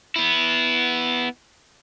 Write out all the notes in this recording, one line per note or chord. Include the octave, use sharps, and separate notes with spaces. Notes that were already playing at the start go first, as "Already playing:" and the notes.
B3 E4